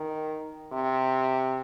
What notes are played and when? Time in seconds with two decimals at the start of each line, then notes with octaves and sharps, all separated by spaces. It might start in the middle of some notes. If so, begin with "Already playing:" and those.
Already playing: D#3
0.72 C3